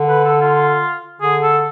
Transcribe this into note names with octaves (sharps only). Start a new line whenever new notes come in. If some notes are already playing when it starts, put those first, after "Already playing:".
Already playing: D3
B4
A4
F4
D3 G#4
A4